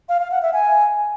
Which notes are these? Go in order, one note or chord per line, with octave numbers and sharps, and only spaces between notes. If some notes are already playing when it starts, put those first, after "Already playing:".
F5
F5
F#5
E5
G#5